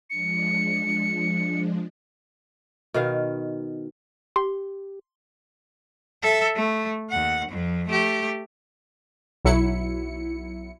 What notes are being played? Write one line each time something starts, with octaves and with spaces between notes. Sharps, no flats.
F3 G#3 D4 C#7
B2 D#3 F5
G4 C6
A4 E5
A3
D#2 F#5
F2 F3
A3 G4
B1 F#3 E4 C#7